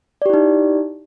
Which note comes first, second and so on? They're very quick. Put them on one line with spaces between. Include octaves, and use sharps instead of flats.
D5 G4 E4 D#4